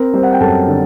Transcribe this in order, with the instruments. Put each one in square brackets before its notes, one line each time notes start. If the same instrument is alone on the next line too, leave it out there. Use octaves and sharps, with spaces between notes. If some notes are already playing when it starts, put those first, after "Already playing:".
Already playing: [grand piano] C4 A#4
G3 C4 C5
F#5
G5
F#2 A4 A5
D3